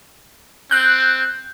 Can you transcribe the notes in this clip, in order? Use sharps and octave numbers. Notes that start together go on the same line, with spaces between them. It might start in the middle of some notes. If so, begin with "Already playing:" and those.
C4 F#6 G6